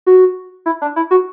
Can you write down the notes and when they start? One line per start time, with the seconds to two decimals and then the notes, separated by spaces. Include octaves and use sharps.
0.07 F#4
0.66 E4
0.82 D4
0.96 E4
1.11 F#4